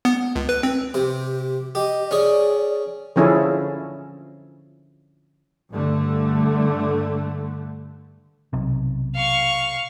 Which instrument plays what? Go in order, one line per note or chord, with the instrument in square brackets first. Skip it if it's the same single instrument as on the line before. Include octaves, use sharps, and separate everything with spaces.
[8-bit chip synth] B3
C#2
B4
C4
[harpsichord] C3 [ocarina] G4
[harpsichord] G4 [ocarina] D#5
[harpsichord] C#4 G#4 [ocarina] D5
[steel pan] D3 F3 C#4 E4 G#4 A4
[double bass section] G2 D3 A3
[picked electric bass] B1 C3
[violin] F5 C#6